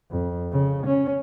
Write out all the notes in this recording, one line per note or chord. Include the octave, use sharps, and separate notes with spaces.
F2
C#3
C#4